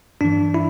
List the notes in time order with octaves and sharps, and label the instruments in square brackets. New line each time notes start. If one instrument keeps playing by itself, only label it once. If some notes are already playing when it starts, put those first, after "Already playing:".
[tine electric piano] G2 E3 D4
E4